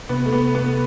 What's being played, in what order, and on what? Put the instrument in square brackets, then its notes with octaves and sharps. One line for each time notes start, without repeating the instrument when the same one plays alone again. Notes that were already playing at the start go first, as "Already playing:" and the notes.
[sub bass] C3 [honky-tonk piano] B3
[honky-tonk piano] A3
B3
B3